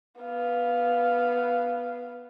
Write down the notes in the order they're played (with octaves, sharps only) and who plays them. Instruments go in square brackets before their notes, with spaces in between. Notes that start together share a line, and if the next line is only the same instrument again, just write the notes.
[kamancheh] B3 F5